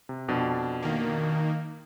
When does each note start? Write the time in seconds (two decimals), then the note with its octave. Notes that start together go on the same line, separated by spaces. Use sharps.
0.09 C3
0.28 F2 B2 D4
0.82 D#3 A#3